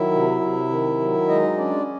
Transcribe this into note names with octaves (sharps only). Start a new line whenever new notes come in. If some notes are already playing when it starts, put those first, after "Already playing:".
Already playing: D#3 F#3 E4 E5
C3
C3
D#3
F#3
G#3 D#4 D#5
C#4 D4 D5